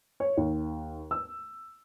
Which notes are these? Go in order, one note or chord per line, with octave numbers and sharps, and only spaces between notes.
C#5
D#2
E6